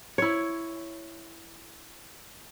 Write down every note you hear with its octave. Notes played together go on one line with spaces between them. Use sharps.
E4 C#5